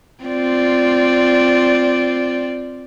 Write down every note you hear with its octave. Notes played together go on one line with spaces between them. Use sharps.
C4 F4 D5